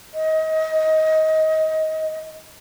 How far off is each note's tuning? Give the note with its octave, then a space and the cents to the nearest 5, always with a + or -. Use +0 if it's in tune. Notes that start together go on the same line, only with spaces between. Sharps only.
D#5 +25